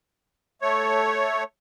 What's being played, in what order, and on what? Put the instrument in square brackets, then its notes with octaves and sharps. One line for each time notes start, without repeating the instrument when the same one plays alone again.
[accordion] A3 C#5